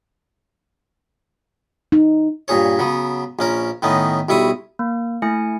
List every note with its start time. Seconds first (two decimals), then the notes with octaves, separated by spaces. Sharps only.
1.92 D#4
2.48 G2 A#2 G#4 C#5
2.79 C#3 F#3 B3
3.39 A#1 C#4 A#4
3.82 A2 D#3 B3 C#4 D#4
4.29 B1 G3 E4 C#6 D#6
4.79 A#3
5.22 A3 E4 G#5 C#7